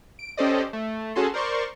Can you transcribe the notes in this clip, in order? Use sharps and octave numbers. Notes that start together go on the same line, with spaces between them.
D7
C#4 G4 A4 C5 D5 D#5
A3
C#4 F#4 G#4 A4 A5 C6
A#4 C5 D5 C6 C#6